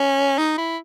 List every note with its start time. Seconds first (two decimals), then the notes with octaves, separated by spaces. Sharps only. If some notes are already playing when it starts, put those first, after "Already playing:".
Already playing: C#4
0.38 D#4
0.58 E4